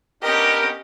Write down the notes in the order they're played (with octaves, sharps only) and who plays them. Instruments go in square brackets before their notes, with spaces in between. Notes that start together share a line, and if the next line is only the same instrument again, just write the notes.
[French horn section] B3 D4 G4 [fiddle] C#4 D#5 [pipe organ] A#4